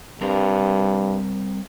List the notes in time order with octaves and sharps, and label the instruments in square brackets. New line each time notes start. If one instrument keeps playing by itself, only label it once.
[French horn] G2 [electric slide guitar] G3 C4 A#4